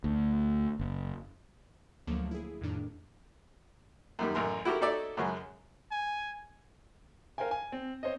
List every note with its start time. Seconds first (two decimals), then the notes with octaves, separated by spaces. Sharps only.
0.04 D2
0.79 F#1
2.07 D2 D3 F3 F#3 A3 A#3
2.31 E4 G#4
2.61 F2 A2 D#3 D4
4.19 F#2 D#3 G3
4.35 A1 F#2 A#4 C6
4.65 E4 F#4 G4 A4 A#4
4.81 D#4 F#4 A4 C#5 D5 E5
5.17 F#2 C#3 F#3 G#3
5.91 G#5
7.38 A#4 C5 F5 G5 G#5
7.51 G#5
7.72 C4
8.03 C4 C5 C#5 D#5